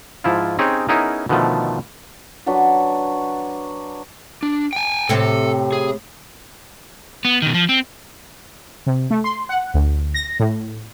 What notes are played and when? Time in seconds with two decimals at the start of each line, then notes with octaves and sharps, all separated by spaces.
0.24 G#2 F3 E4 F4
0.59 C4 C#4 D#4 G4 G#4 C#5
0.88 B3 C#4 D#4 E4 G#4 A#4
1.29 B2 D3 D#3 F3 A3
2.46 F#3 D4 F#4 B4
4.43 D4
4.73 G5 G#5
5.09 A2 C3 C4 A4
5.73 G#4
7.25 B3
7.42 B2 D#3
7.54 F3
7.69 C4
8.86 C3
9.11 A3
9.24 C6
9.49 F#5
9.74 D2
10.14 A#6
10.40 A2